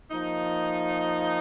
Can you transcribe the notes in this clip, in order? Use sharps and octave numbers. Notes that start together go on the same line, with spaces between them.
F3 A#3 D#4